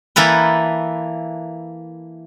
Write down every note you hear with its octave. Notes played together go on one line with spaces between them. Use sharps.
E3 A#3 A4 B4